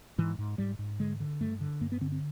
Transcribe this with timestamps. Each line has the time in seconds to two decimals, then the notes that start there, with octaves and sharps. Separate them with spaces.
0.18 G#2 E3
0.39 G#2
0.58 G#2 G3
0.79 G#2
1.00 D3 G#3
1.20 D3
1.40 G2 A3
1.61 D3
1.81 G2 A#3
1.92 B3
2.01 D3 C4
2.12 C4